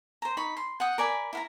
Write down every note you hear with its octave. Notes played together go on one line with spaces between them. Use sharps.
C5 A#5
D#4 B5 C#6
C6
F#5 G5 D#6
A#4 D5 G#5 B5
E4 F5 A#5